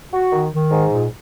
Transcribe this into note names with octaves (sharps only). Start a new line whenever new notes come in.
F#4
D#3
D#3
G#2
A#2